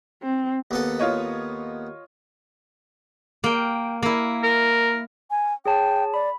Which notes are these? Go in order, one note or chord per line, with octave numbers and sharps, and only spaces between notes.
C4
D#2 B3 A4
F4 C#5 D#5
A#3 G5
A#3 E4
A#4
G#5
G#4 C#5 G5 A5
D5 B5